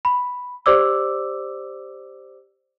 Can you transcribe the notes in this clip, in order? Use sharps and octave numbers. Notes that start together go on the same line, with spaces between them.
B5
G4 C5 D5 D6 E6